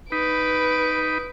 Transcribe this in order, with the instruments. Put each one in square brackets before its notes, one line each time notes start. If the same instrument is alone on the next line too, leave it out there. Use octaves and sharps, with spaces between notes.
[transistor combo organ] D#4 B5 [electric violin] B4 D7